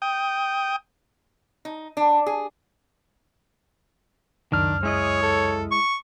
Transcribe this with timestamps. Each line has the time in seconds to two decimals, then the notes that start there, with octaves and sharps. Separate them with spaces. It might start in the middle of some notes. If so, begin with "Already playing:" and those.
0.02 G5 D#6
1.65 D#4
1.97 D4
2.26 G#4
4.52 C#2 F#2 D#3 D4 F6
4.83 G#3 E4 G#4 C#5 D#5
5.22 A4
5.71 C#6